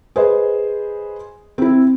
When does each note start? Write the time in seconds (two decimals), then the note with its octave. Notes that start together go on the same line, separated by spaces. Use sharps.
0.16 G#4 B4 C5 D#5
1.58 C4 E4